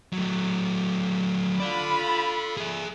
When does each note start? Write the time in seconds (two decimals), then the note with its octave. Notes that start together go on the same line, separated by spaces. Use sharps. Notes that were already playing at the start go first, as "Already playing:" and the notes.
0.13 F#3 A3
1.60 F4 A4 D5 B5
2.57 G#4 E5